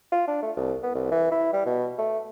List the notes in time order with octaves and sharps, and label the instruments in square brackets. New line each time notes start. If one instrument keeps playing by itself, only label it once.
[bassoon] F4
D4
A3
C2
B3
C2
E3
E4
G3
B2
A3